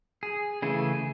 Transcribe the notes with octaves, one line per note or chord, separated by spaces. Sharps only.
G#4
C#3 E3 A3 G#4